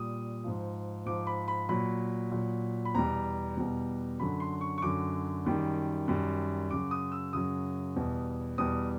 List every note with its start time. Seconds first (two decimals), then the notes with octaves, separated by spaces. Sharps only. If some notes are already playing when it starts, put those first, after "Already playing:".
Already playing: A#2 G3 D#6
0.44 G#2 F3
1.06 G#2 F3 D6
1.27 B5
1.48 B5
1.69 A#2 F#3 B5
2.31 A#2 F#3
2.85 B5
2.94 E2 B2 G3 A#5
3.57 E2 B2 G3
4.19 F#2 D3 F#3 B5
4.40 C6
4.61 C#6
4.78 C#6
4.82 F#2 D3 F#3 D6
5.45 F#2 D#3 G3
6.08 F#2 D#3 G3
6.70 F#2 C#3 F#3 D6
6.91 D#6
7.12 E6
7.33 F#2 C#3 F#3 D#6
7.96 E2 B2 G3
8.58 E2 B2 G3 D#6